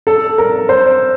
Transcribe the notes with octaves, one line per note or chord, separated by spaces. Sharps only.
A4
A#4
C5